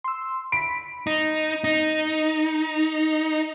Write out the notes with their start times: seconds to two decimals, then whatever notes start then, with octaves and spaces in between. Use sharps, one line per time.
0.04 C6 E6
0.52 B5 B6 D7
1.07 D#4
1.64 D#4